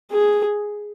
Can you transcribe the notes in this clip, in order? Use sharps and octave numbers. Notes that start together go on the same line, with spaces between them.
G#4